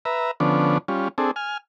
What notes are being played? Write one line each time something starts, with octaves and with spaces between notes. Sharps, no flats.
B4 E5 A#5
D3 F3 B3 C#4 D4
G3 C#4 F4
C4 D4 G#4 A4
G#5 F6